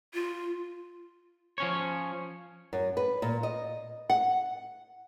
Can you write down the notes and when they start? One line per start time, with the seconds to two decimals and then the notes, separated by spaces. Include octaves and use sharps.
0.14 F4
1.58 F3 C#4 C#5
2.73 F#2
2.97 B4
3.22 A#2
3.43 D#5
4.10 F#5